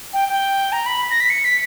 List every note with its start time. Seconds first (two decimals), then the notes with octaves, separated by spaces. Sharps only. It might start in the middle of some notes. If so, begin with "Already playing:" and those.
0.13 G5
0.29 G5
0.72 A#5
0.86 B5
1.11 A#6
1.20 B6
1.30 C#7
1.45 B6